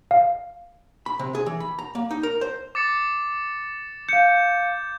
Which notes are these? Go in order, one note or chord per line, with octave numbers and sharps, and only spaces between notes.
F5
B5
C3
G#4
E3
B5
A#5
A#3
D#4
A#4
C5
D6 A6 C#7
F5 G6 C#7